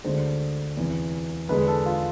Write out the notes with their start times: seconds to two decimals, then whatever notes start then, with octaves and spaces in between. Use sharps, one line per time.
0.04 D2 D3 G#3 C5
0.77 E2 C3 E3
1.49 E2 D3 G#3 B4
1.68 A4
1.86 F4